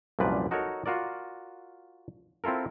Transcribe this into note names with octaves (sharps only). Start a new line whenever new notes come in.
C2 F#2 A#2 F3 B4 D5
D#4 F#4 A4 A#4 C#5
F4 F#4 A#4 D5
C4 E4 F4 A4 A#4